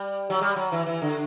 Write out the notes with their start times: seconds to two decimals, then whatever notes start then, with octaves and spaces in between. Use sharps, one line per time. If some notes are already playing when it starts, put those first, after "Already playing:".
Already playing: G3
0.30 F#3
0.41 G3
0.56 F#3
0.72 E3
0.86 E3
1.02 D3